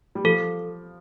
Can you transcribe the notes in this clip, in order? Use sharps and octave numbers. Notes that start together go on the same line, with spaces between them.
G3
F3 A4